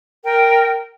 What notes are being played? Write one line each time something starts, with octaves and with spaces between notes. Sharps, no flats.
A#4 G5